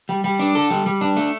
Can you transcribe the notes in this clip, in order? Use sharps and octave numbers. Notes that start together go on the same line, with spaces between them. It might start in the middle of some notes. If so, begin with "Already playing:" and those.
G3
G3
D4
A4
G3
G3
D4
A3